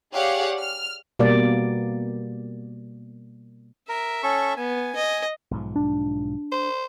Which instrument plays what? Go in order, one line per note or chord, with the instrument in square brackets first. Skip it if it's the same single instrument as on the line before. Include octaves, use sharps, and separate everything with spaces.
[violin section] G4 G#4 C#5 D5 F5 F#5
F6
[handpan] B2 G3 A#3 D5
[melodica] A#4 [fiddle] E5
[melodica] C#4 A4 C#6
[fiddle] B3 [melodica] G#5
[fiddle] D#5
[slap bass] B1 G#2 F3
[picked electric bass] D4
[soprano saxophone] C5